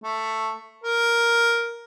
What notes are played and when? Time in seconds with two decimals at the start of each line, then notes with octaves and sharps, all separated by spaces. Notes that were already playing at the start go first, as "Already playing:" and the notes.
0.04 A3
0.84 A#4